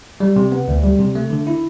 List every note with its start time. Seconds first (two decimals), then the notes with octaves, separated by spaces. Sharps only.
0.20 G3
0.36 C3
0.52 B3
0.68 D2
0.84 G3
0.99 C3
1.15 A3
1.30 D3
1.47 E4